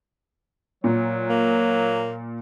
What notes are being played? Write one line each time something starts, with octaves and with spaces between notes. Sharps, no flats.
A#2 F#3
A#3